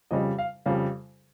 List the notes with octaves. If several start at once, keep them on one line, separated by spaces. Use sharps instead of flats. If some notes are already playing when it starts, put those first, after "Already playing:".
F2 C#3 G3 D#5
F5
F2 C#3 G3 F5